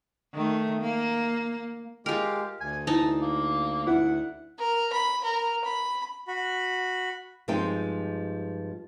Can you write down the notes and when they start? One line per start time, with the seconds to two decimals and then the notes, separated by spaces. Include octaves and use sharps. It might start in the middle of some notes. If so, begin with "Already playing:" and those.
0.34 D#3 A3
0.82 A#3
2.06 G#3 F4 G4 A#4
2.61 D2 G#5
2.87 E3 D#4 A5
3.22 A#3
3.87 E4 F#5
4.59 A#4
4.93 B5
5.24 A#4
5.64 B5
6.28 F#4 B5
7.48 G2 F3 G#3 C4 D#4 G5